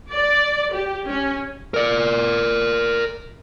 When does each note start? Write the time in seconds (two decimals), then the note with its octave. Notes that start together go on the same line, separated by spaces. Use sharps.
0.11 D5
0.73 G4
1.09 C#4
1.74 A#4 D5